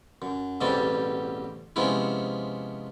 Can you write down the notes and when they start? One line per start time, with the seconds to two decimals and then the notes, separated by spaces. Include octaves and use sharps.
0.22 F#2
0.61 A1 E2 B2 G3 C4 A5
1.76 C3 F3 G#3 B3 C#4 E4